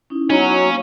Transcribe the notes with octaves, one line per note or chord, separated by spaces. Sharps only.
C#4 D#4 E4
F#3 B3 C#4 D#4 A#5 B5
B5
A#3 F5